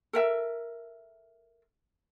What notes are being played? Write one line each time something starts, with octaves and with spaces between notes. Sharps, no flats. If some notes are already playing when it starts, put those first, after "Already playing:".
A4 A#4 E5